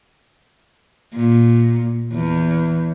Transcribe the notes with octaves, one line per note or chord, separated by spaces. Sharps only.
A#2
E2